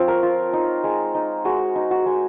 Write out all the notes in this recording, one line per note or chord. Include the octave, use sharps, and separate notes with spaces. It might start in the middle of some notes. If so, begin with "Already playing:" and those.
Already playing: F3 C4 C#5
A#4
F4
D#4
G#3
D#4
G#3 F#4
D#4
F#4
G#3